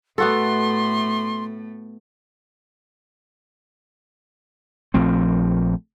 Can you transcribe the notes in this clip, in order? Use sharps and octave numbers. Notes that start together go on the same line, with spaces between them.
A2 A3 B3 F#4 A4 C6
A#1 F3 A3 C4